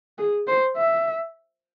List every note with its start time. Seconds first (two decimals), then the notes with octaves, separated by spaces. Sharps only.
0.18 G#4
0.47 C5
0.77 E5